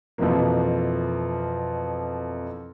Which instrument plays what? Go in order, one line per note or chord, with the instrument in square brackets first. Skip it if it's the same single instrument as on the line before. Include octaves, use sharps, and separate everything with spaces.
[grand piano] F2 B2 E3 F3 A#3